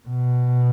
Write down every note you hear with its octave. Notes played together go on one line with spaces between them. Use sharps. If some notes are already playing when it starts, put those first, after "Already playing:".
B2